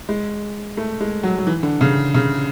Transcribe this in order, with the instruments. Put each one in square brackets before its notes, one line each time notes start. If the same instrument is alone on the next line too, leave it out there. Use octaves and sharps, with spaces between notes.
[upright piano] G#3
A3
G#3
F#3
F#3
E3
D3
C#3
C#3